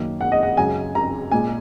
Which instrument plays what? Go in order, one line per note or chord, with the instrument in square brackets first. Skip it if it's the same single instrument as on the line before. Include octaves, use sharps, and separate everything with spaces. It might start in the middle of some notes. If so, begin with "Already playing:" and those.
Already playing: [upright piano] F#2 D#3 A#3
F#5
D#5
F#5
F#2 C#3 G#3 G#5
A#5
A#2 G#3 G#5